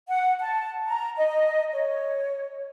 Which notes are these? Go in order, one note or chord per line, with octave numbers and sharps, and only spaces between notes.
F#5
A5
A#5
D#5
C#5